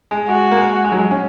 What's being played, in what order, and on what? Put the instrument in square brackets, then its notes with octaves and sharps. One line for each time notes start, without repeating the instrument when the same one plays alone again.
[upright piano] G#3
[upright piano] G#3 [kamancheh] F#4
[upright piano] A#3
G#3
G#3
F#3
G#3
C#4